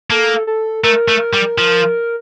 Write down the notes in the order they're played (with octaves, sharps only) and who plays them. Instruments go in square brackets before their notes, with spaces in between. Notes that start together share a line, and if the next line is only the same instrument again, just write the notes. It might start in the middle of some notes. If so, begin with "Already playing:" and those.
[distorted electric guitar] A#3 [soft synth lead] A4
[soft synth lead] A4
[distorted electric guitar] A3 [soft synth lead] A#4
[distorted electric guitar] A3
G3
F3